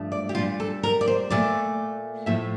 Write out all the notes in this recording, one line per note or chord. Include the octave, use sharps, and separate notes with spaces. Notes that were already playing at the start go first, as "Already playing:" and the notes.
Already playing: G2 F3 A3
D5
G4
A#2 G3 F4
A4
A#4
D5
C5
A#2 A3 D5
A2 F3 A3 E5